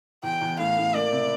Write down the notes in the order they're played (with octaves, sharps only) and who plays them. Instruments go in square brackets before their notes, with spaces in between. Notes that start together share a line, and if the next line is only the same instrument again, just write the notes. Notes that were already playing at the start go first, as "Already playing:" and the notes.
[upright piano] E2 [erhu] G5
[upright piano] E2
[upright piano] A2 [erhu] F5
[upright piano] A2
[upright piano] A#3 [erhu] D5
[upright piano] C3